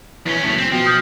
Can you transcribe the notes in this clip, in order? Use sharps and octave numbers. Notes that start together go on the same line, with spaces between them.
E2 E3 C#4
F#1 A2 B6 C#7
C4
B2 F3 G5
D#6 F6 G6